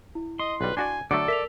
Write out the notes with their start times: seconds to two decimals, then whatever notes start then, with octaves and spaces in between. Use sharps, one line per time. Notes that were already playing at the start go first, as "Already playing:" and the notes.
0.15 E4
0.39 D#5 C6
0.61 B1 G3 B4
0.77 D4 F#4 D5 G#5
1.11 D3 F#3 A3 A4 D5 C#7
1.28 A#4 E5 B6 F7